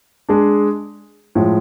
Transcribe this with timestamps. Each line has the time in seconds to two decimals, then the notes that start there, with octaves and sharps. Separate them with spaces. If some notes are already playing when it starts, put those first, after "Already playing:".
0.29 G#3 D4 G#4
1.35 A2 F3 G#3